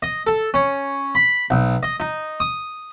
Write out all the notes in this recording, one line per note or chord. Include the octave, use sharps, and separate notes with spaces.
D#5
A4
C#4
B5
B1
D#5
D#4
D#6